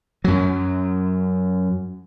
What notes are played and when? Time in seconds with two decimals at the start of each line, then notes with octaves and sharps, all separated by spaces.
0.24 F#2 F#3